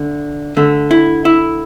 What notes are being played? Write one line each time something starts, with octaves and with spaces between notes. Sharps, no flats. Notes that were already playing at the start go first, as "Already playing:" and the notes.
Already playing: D2 D3
D2 D3 A3
E4
E4